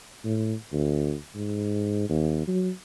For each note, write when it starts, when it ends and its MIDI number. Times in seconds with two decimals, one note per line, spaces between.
0.25 0.54 45
0.73 1.15 38
1.35 2.07 44
2.10 2.44 39
2.47 2.71 54